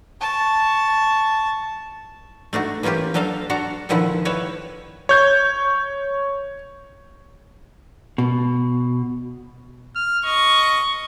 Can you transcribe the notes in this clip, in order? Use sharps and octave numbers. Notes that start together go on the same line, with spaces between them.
A5 C#6
A3 D4 D#4 F#4
E3 A#3 C#4 F4 G4
F#3 D4 A4 D#5 F5
D4 F#4 F#5 A5 A#5
A#2 D3 D#3 F3 E4 F#5
G3 E4 B4 C#5 E5
C#5 G6 G#6
B2
F6
D#5 C#6